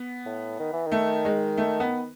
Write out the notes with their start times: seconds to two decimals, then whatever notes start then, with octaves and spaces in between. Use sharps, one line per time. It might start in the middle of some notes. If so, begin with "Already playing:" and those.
Already playing: B3
0.25 A2
0.59 D#3
0.73 E3
0.86 D#3
0.92 A3
1.25 G#3
1.57 A3
1.80 B3